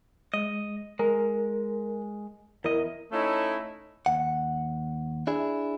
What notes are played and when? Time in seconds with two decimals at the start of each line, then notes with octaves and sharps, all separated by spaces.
0.34 G#3 D#5
0.99 G#3 A#4
2.64 E2 E4 A#4 D#5
3.11 A3 C#4 D#4 E4
4.06 D#2 F#5
5.27 D4 E4 G#4